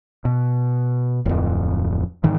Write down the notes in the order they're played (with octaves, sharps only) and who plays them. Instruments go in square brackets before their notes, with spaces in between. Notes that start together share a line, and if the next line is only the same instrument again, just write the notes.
[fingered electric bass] B2
D1 F2
G#2 D#3 E3